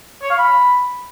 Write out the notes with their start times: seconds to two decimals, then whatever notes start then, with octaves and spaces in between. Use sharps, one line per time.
0.22 C#5
0.30 F5
0.39 B5